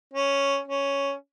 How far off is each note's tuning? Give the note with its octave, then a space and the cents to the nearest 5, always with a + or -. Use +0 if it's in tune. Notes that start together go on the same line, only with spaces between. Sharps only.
C#4 +0
C#4 +5